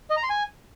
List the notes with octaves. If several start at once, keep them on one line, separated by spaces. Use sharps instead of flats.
D#5
A#5
C6
G#5